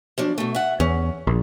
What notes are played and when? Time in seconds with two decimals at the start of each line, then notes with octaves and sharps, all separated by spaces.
0.18 F3 F#3 D4
0.38 B2 A3
0.55 E5 F#5
0.80 E2 C#4
1.27 A#1